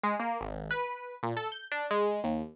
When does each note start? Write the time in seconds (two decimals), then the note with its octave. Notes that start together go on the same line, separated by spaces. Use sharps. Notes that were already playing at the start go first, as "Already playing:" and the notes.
0.04 G#3
0.20 A#3
0.41 G#1
0.71 B4
1.23 A#2
1.37 A4
1.52 G6
1.72 D4
1.91 G#3
2.24 D#2